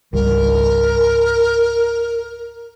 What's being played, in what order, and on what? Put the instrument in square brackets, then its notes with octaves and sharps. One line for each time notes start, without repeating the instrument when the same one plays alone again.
[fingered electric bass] G#1 C#2 G3 [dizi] A#4